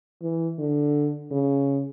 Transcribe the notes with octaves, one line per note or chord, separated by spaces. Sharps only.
E3
D3
C#3